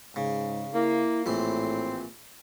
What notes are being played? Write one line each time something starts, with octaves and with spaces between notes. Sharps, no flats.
G#2 C#3
A#3 E4
A#1 A2 E3 C4 C6